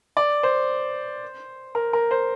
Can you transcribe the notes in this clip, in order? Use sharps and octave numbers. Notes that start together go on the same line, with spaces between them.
D5
C5
A#4
A#4
C5